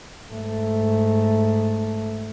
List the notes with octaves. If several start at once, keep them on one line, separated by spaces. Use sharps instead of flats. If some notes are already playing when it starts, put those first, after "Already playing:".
G#2 A3